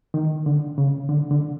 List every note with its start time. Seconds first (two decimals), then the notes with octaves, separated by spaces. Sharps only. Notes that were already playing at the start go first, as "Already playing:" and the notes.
0.14 D#3
0.46 D3
0.78 C#3
1.09 D3
1.31 D3